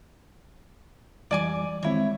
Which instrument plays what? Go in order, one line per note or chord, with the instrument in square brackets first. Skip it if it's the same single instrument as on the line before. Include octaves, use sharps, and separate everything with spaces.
[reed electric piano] F2 E3 G3 [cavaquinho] D5 G#5 D6
[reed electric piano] D#3 G#3 C4 [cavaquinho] E4 C#5